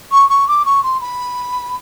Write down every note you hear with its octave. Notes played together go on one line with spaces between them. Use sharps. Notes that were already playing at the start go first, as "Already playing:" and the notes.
C#6
C#6
D6
C#6
C6
B5